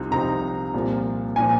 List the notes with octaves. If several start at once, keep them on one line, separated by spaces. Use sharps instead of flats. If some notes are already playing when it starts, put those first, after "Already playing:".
Already playing: C2 C3 F3 C4 D#4
C2 C3 F3 C4 D#4 A#5
C2 A#2 F3
A#2 F3 G#5